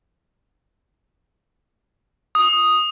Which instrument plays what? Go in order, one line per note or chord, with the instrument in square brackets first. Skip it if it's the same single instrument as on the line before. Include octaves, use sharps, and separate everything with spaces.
[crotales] D#6